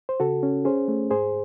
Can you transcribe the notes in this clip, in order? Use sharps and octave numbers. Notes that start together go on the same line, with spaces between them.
C5
C#3 F#4 A4
C#4
C#4 G#4 C5
A3
G#2 G#4 C5